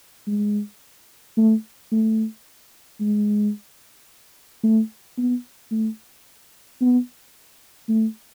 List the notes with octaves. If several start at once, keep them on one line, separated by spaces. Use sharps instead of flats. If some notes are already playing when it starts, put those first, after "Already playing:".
G#3
A3
A3
G#3
A3
B3
A3
B3
A3